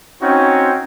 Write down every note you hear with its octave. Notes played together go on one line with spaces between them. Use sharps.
C4 C#4 D#4 F#4 G5